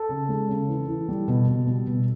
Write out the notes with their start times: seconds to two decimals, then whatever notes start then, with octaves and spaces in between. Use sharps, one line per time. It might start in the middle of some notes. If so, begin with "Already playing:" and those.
Already playing: A4
0.09 C#3
0.29 G#3
0.49 C#3
0.68 E3
0.88 E3
1.09 G3
1.28 B2
1.48 B2
1.67 G3
1.87 B2